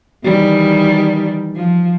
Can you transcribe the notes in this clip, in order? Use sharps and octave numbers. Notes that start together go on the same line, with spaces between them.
D#3 E3 G3
F3